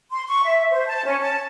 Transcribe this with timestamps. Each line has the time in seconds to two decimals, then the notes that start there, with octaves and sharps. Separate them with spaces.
0.12 C6
0.28 C#6
0.43 E5
0.72 C5
0.87 A5
1.05 C#4
1.21 A5